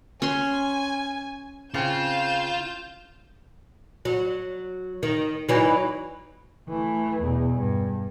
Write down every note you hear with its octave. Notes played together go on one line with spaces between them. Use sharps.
C#4 G#5 C6
C#3 C4 F4 G6 E7
F#3
D#3
E3 F#3 D#4
E3 A3
E2 B2
G2